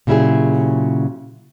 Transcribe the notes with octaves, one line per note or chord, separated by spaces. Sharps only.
A#2 C#3 F#3 E4 G4 G#4